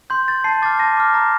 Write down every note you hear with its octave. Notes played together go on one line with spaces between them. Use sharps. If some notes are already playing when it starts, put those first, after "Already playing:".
C6 G6
G6 A6
A5 C7
D6 F6 A6
A5 A#6
D6 F6
A#5